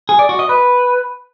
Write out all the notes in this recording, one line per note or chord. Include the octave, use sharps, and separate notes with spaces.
G#4
D5
F#4
D#5
B4